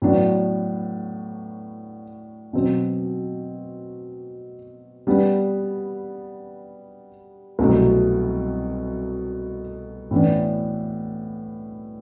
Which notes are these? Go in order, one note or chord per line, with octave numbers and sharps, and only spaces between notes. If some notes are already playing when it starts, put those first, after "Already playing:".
A2 F#3 B3 D4
B2 F#3 C4
G3 B3 D4
C2 B2 F#3 A3 C4
A2 E3 B3 D4